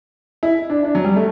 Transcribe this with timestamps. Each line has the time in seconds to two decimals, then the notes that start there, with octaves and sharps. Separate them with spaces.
0.43 E4
0.70 D4
0.84 D4
0.95 F#3
1.04 G3
1.16 A3